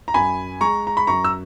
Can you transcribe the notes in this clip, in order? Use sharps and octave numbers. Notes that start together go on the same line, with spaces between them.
A#5
F#2 G#5 B5
G#3 A#5 C#6
A#5
B5
F#2 A#5 C#6
E6